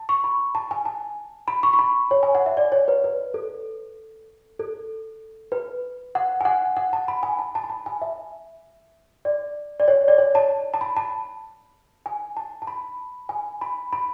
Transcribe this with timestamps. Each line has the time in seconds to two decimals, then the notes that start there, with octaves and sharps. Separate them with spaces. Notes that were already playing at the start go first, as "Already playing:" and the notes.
Already playing: A5
0.09 C#6
0.24 B5
0.55 A5
0.71 G#5
0.85 A5
1.48 B5
1.63 C#6
1.73 C#6
1.79 B5
2.11 C#5
2.23 G#5
2.35 F#5
2.46 E5
2.57 D5
2.72 C#5
2.88 B4
3.04 B4
3.34 A4
4.59 A4
5.52 B4
6.15 F#5
6.41 G#5
6.45 F#5
6.77 F#5
6.93 A5
7.08 B5
7.23 G#5
7.39 A5
7.55 A5
7.64 B5
7.69 A5
7.86 G#5
8.02 E5
9.25 D5
9.80 D5
9.88 C#5
10.08 D5
10.18 C#5
10.35 A5
10.74 A5
10.81 B5
10.96 A5
12.06 G#5
12.37 A5
12.62 A5
12.67 B5
13.29 G#5
13.61 B5
13.93 B5